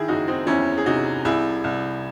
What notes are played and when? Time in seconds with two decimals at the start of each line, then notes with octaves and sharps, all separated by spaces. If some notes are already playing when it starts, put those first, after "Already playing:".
Already playing: D#3 E4 G#4
0.08 F#1 D#4 F#4
0.28 C4 D#4
0.47 E2 C#4 E4
0.77 G#4
0.86 C3 D#4 F#4
1.25 C2 E4 G#4
1.64 C2